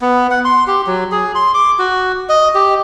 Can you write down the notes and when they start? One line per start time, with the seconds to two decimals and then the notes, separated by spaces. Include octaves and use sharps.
0.01 B3
0.31 F#5
0.45 C6
0.67 G4
0.87 F#3
1.12 G#4
1.35 C6
1.54 D6
1.79 F#4
2.29 D#5
2.55 G4